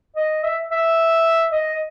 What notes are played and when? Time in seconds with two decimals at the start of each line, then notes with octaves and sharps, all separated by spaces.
0.16 D#5
0.44 E5
0.71 E5
1.51 D#5